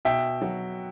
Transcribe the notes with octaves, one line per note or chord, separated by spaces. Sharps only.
B2 E5 G5
F#3